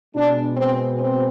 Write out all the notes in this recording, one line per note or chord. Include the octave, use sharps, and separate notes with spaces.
B2 G#3 B3 D4
C4
C4